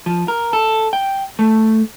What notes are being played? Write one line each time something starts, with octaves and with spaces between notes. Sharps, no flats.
F3
A#4
A4
G5
A3